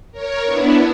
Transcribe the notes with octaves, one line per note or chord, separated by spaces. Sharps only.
A#4 C#5
B3 D4 E4